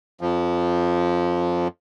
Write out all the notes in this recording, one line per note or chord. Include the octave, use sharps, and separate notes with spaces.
F2 F3